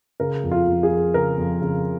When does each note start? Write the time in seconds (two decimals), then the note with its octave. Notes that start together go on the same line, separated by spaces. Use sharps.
0.20 C#3 A#4
0.44 F2
0.51 F4
0.67 F2
0.83 G#4
0.90 F2
1.14 C#3 A#4
1.38 F2
1.61 C#3